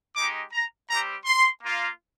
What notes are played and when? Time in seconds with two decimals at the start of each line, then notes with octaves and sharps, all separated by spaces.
0.16 G#3 D#4 G4 D6
0.52 A#5
0.89 G3 C4 G4 A#5
1.25 C6
1.62 A#3 F4